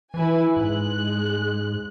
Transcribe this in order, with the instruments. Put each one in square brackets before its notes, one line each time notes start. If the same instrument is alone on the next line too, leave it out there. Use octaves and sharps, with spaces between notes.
[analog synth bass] E3 [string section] E4 B4 G#5
[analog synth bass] G#2 [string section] G#3 F#6